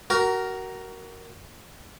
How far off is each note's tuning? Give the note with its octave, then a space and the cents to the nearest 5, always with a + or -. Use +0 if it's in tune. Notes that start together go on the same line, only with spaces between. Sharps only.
F#4 +30 A#4 +0